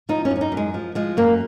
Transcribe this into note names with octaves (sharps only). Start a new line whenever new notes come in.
F3 D#4
C#4
F#2
C#4
D#4
F#2
G#3
F3
F3 G#3
F#2 A#3